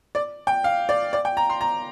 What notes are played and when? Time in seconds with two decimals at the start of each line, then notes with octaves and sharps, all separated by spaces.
0.15 D5
0.47 G5
0.64 F5
0.89 D5
1.13 D5
1.25 G5
1.37 A#5
1.50 C6
1.61 A#5